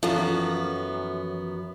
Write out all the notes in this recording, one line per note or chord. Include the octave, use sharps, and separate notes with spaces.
F#2 E3 F3 B3 F4 A4